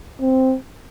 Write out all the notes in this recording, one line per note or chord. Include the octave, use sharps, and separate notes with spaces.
C4